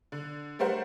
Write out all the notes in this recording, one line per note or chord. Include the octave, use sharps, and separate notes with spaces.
D3
G3 A3 A#4 C5 F#5